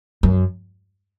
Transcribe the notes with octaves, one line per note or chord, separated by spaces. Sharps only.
F#2